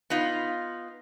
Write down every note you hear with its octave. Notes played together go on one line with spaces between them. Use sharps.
B3 D#4 F4